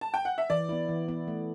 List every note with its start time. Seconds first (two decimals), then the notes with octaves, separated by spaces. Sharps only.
0.01 A5
0.14 G5
0.25 F#5
0.38 E5
0.50 E3 D5
0.69 B3 E4
0.89 E3
1.08 B3 E4
1.28 A3